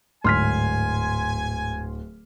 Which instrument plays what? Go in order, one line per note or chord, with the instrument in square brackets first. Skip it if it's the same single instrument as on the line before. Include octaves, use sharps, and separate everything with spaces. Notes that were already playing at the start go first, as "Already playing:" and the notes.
[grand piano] D1 [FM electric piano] G#2 [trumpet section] G#5 [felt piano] C6 F6 B6